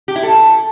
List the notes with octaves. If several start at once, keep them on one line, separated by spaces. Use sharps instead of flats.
G4
E4
A4